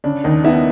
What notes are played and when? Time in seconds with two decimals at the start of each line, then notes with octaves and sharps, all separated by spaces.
0.04 C#3 D4
0.24 D#2 D#4
0.44 B3 E4